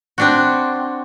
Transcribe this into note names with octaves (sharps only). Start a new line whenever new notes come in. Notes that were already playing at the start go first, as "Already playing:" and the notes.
C4 D4 F#4